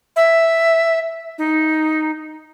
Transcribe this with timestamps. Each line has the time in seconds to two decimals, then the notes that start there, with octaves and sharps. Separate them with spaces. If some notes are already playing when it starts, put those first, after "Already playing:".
0.16 E5
1.38 D#4